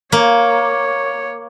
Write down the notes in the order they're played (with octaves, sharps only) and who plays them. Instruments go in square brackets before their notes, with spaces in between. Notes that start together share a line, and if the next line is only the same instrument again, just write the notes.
[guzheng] A#3 [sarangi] C#5